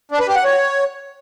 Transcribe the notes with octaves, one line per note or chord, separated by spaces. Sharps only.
D4
B4
G4
F#5
C#5